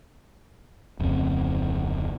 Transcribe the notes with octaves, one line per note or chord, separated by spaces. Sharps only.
D1 F2 C#3 C4